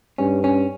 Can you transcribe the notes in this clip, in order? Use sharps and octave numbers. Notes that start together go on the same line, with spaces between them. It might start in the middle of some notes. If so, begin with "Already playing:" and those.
G2 C#4
C#4